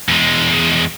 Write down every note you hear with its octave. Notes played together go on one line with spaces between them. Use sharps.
E2 G#3